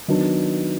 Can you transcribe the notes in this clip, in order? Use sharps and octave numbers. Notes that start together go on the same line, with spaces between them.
D#3 F#3 B3 D4